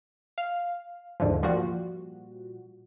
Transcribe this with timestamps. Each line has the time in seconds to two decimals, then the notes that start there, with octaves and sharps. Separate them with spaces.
0.38 F5
1.20 D#2 G#2 D3 E3 F3
1.43 A#2 F3 G3 F#4